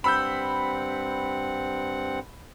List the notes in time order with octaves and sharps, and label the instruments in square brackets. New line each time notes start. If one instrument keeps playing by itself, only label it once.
[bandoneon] G2 C4 F#5 [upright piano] B5 E6 G6